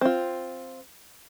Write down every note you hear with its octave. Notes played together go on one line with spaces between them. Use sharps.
C4 F4